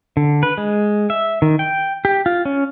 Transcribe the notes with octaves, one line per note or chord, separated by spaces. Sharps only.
D3
B4
G#3
E5
D#3
G5
G4
F4
C#4